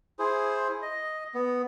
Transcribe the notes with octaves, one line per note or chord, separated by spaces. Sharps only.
E4 G#4 C5
D#5
B3